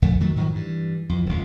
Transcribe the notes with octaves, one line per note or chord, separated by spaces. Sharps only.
A#1 F2 D3 A3
D#3 F#3 A3
G#2 D#3 F3 F#3
G2 E3
F2 E3
D1 C#2